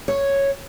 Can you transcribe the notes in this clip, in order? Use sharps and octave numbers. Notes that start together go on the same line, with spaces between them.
C#5